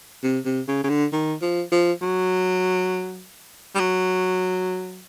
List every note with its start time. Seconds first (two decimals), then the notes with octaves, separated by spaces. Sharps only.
0.23 C3
0.45 C3
0.68 C#3
0.84 C#3
0.90 D3
1.13 D#3
1.42 F3
1.72 F3
2.02 F#3
3.75 G3
3.80 F#3